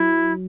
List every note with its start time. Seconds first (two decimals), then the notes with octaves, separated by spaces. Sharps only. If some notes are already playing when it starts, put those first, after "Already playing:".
Already playing: F#3 E4